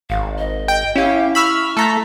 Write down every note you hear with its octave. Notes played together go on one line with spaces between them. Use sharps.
G#1 F5
D#5
G5
C#4 E4 G4 F5
B5 C#6 E6 F6
A3 A4 A#5 B6